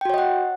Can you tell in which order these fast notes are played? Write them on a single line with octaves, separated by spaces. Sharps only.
G5 F#4 C#5 D#5 F#5